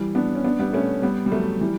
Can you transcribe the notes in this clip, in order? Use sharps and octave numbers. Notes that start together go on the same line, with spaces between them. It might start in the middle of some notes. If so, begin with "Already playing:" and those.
Already playing: E3 G3
B3 D4
C#4
B3 D4
G3 B3
A3 C#4
G3 B3
G3
F#3 A3
E3 G3